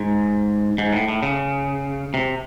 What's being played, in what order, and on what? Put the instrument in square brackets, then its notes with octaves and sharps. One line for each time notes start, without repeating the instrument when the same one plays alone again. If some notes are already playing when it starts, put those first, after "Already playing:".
Already playing: [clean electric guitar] G#2
G#2
A2
A2
C#3
C3